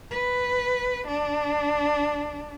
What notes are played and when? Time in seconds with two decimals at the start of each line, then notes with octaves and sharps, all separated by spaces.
0.11 B4
1.07 D4